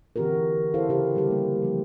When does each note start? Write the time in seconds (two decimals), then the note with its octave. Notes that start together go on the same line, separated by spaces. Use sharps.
0.16 D3 E3 C4 F#4 G4 A#4
0.74 E4 A4 C5 F5
0.89 C#3 G4 A#4
1.15 D3 G3 A3 G4
1.30 A#3
1.62 F3 A#3